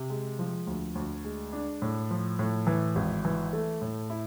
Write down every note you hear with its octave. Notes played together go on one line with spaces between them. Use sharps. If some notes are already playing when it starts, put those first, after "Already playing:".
Already playing: C3
G#3
F3
D2
D2
G#3
D4
A2
F3
A2
E3
G#1
E3
A3
A2
E4